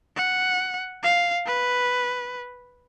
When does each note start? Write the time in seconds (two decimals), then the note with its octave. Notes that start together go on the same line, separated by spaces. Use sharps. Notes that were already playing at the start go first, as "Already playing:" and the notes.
0.17 F#5
1.04 F5
1.46 B4